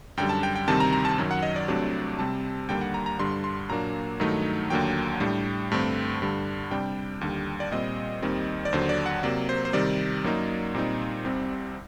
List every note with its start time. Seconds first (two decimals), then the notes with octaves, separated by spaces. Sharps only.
0.17 F#2 D3 G3 G5
0.29 A5
0.43 G5
0.56 G5
0.68 D2 C3 D#3 G3 C4 A5
0.80 A#5
0.92 A#5
1.05 A5
1.18 F#2 D#3 F#3
1.31 F#5
1.43 D#5
1.56 D5
1.68 C2 C3 F#3 A3 D4
2.19 C3 G3 C4 A5
2.68 D#2 D3 G3 A#3 D4 G5
2.81 F#5
2.94 A#5
3.06 A#5
3.19 G2 D3 G3 D4 C6
3.44 C6
3.69 A#2 F#3 A#3 D4 A#5
4.20 G2 D#3 F#3 A3 D#4
4.70 D#2 D3 F#3 A#3 G5
5.20 A2 G3 D4
5.71 G2 D3 A3 C4
6.22 G2 D3 G3
6.71 C3 G3 D4 G5
7.21 D#2 D3 G3
7.60 D5
7.72 A#2 G3 C4 D#5
8.22 D#2 D#3 G3 C4
8.65 D5
8.72 D#2 D3 F#3 C5
8.89 D5
9.06 F#5
9.23 C3 F#3 A#3 D5
9.49 C5
9.65 C5
9.73 C3 D#3 G3 D5
10.24 F#2 F#3 A#3 D#4
10.75 A#2 G3 C4 D#4
11.25 C2 C3 G3 C4